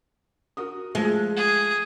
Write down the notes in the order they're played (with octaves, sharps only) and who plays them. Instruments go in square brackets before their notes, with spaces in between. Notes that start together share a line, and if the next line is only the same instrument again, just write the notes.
[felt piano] F#4 A#4 D#6
[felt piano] F3 A3 [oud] G#3
[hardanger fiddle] G#4